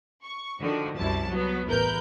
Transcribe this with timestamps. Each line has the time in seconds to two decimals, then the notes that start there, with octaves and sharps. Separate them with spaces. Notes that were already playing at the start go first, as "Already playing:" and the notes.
0.23 C#6
0.61 D3 D#3 F3 F#4
0.96 C2 F#2 E4 A5
1.29 F#3 B3
1.67 A1 E2 A#4 B4 G6